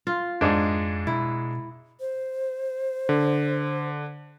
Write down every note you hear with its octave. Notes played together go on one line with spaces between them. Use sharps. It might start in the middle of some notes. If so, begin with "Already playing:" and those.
F4
F2 G#2 G#3 D4
B2 E4
C5
D3